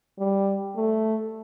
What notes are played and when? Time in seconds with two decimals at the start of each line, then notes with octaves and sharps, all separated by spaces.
0.19 G3
0.75 A3